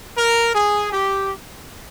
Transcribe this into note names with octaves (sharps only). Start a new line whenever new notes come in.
A#4
G#4
G4